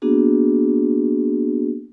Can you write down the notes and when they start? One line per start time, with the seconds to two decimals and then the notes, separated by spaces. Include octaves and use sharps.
0.02 A#3 B3 D4 F#4 G#4